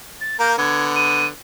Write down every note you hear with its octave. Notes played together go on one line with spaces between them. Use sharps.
A6
A#3 A#4 G6
D3 B3 G#6
D#7